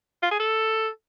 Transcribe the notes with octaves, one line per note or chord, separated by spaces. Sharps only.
F4
G#4
A4